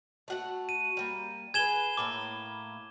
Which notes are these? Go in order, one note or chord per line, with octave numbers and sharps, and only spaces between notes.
A3 F#4 F#5
D#7
G3 A#3
G#4 B4 G#6 E7 G7
A2 A#3 E4 D6